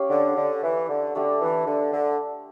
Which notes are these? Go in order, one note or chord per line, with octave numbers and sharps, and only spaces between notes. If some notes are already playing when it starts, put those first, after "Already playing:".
Already playing: C#4 G4 D5 F5
D3
D3
E3
D3
D3 A3 D4 G4
E3
D3
D3